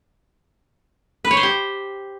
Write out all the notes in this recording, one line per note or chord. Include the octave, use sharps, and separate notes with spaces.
B4
C#5
C5
G4